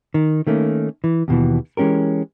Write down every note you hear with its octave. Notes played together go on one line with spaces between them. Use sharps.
D#3
D#3 A3 A#3 C#4
E3
D#2 B2 E3
E3 G#3 C#4 G4 A#4